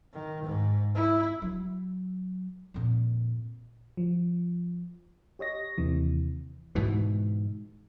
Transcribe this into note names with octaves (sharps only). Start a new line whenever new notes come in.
D#3
G#2
E4
F#3
F2 A#2
F3
G4 C#5 D#5 A#6
D#2 C3 E3
G#2 B2 E3